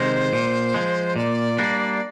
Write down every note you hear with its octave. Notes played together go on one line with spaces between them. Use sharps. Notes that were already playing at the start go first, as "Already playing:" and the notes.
Already playing: C3 D#3 G#3 C5
A#2
F3 G#3
A#2 D5
G3 A#3 D4